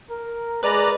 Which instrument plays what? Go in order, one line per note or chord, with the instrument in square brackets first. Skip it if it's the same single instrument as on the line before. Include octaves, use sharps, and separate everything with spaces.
[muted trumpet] A#4
[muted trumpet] G#3 [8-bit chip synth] B4 D5 A#5